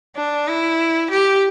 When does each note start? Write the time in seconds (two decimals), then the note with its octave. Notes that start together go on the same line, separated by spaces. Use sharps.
0.16 D4
0.47 E4
1.10 G4